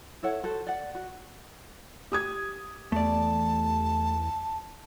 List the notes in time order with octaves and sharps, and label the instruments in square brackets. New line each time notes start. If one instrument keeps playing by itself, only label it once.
[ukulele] E4 A4 C#5 F#5
F#4 A4 C5
D5 F#5
F#4
[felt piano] G4 D#6 G#6
[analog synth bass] E2 [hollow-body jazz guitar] A3 D5 [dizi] A5